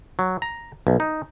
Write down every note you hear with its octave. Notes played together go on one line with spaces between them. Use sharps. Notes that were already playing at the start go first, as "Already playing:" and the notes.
F#3
A#5
B1
D#4